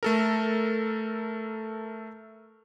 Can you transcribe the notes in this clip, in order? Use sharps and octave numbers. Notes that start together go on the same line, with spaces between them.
A3 A4 A#4